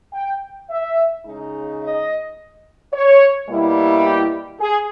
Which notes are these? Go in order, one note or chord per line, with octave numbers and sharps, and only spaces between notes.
G5
E5
C#3 G#3 D#4
D#5
C#5
B2 G3 A#3 E4
G4
G#4